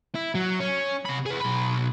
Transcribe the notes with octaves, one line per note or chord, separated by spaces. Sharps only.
E4
F#3
C#4
C3 B5
G#4 B4
B1 B5